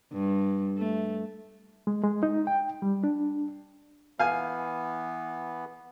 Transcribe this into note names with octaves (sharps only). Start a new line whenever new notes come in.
G2
A3
G#3
G#3
D#4
G5
G3
D4
E3 B3 F5 G#5